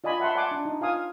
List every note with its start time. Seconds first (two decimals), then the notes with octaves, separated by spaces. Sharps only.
0.04 F4 D5 D#5 G#5 B5
0.20 E5 F#5 A5 B5 C6
0.35 D5 F#5 G#5 A5 C6 D6
0.51 D4
0.65 D#4
0.81 F4 F5 G#5 D#6